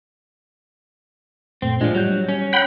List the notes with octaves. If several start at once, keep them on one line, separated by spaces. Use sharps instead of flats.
F#2 A#2 A3 C4
A2 F3 G#3 D4 F4
F#3 G3 G6
G3 C#4
F#5 G5 B5